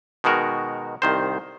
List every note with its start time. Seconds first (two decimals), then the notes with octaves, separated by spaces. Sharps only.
0.24 B2 D#3 G#3 F#4 A#4
1.02 C2 D#3 C5